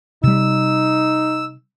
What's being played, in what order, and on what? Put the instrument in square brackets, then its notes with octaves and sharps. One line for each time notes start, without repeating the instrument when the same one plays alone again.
[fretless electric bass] C3 G3 [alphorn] D#4 [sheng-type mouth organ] E6